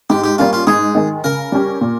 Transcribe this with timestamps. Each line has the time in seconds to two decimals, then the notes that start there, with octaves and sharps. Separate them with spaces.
0.10 G#2 G4
0.24 G4
0.38 G3 A#3 C#4 F4
0.53 F4
0.67 G#2 G#4
0.95 D#3 G#3
1.24 C#3 A#4
1.52 G3 C#4 G4
1.81 A#2